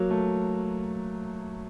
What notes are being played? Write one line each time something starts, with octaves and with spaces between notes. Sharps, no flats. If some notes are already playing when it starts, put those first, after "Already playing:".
Already playing: F#3 A#3
A3